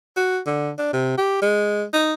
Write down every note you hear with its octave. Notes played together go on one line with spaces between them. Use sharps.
F#4
D3
D4
C3
G4
G#3
D#4